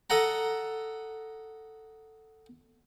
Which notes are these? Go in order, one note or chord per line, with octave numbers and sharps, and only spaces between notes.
A4 D#5 F#5 A#5